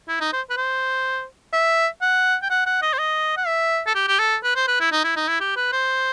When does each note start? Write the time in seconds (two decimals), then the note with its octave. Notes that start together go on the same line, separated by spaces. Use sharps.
0.08 E4
0.21 D#4
0.33 C5
0.50 B4
0.57 C5
1.53 E5
2.02 F#5
2.42 G5
2.50 F#5
2.66 F#5
2.82 D#5
2.93 C5
2.99 D#5
3.37 F#5
3.47 E5
3.87 A4
3.95 G4
4.08 G4
4.19 A4
4.44 B4
4.56 C5
4.68 B4
4.80 E4
4.92 D#4
5.04 E4
5.16 D#4
5.28 E4
5.41 G4
5.56 B4
5.72 C5